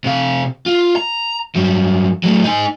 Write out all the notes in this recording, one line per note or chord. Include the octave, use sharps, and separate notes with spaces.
C3 F5
F4
A#5
G2 F#3
F#3 A3
D#4 G#5